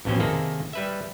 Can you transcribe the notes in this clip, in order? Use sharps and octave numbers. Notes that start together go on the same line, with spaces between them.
A1 F2 B2 C#4 C5
C3 D#3 A#3 G#4 A4
G3 B4 E5